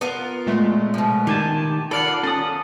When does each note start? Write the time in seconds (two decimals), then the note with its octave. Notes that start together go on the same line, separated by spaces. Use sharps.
0.01 B3 F4 A#4
0.47 A#2 G#3 A3
0.94 B2 F3
1.27 D#3 G4 G#5 A5
1.91 F4 A4 A#4 D5 F#5 B5 F6 C7
2.23 C#4 A4 D#6